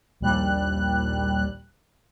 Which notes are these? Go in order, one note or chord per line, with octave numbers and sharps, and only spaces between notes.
A#1 D#2 G3 F#6